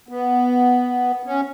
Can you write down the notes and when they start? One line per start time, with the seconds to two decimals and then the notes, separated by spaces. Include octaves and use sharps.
0.09 B3
1.24 C#4